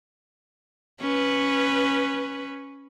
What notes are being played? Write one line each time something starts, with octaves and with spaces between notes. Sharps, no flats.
C#4 B4